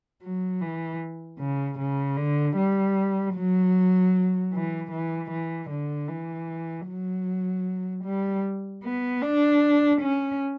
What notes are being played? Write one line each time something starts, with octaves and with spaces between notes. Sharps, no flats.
F#3
E3
C#3
C#3
D3
G3
F#3
E3
E3
E3
D3
E3
F#3
G3
B3
D4
C#4